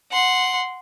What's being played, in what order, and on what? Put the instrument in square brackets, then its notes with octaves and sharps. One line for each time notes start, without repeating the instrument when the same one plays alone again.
[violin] F#5 C6